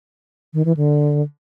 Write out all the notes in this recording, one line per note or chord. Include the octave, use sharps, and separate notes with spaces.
D#3
E3
D3